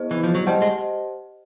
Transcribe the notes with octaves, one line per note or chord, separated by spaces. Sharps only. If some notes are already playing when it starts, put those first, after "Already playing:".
Already playing: B3 E4 G#4 C5 D#5
E3
F3
F#3
G3 G4 C5 D#5 F#5 A5
G#3